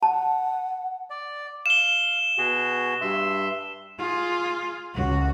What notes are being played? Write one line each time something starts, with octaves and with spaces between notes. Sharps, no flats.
F#5 A5
D5
F5 E7 G7
B2 F#4 G#4
G2 E5 C6
F4 G#4
C#2 F#4